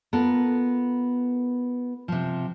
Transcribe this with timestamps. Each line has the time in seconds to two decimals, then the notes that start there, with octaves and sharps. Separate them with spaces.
0.13 B3 F4 A4 A#4
2.08 C3 F3